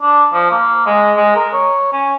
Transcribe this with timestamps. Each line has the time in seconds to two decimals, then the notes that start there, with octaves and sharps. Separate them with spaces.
0.02 D4
0.33 F3
0.51 A#3
0.86 G#3
1.17 G#3
1.36 A#4
1.54 C#5
1.93 C#4